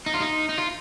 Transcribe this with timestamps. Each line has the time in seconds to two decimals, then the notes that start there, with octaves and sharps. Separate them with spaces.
0.06 D#4
0.14 F4
0.21 D#4
0.49 D#4
0.58 F4